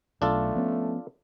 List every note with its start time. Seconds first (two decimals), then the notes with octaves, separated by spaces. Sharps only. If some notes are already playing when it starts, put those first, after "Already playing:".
0.22 B1 A3 D4 F4 A4
0.55 F3 B3 C#4